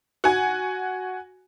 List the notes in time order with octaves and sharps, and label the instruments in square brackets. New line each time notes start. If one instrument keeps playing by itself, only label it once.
[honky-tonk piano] F#4 G#5